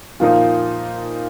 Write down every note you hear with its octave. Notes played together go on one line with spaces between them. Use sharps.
A#2 F3 A#3 D#4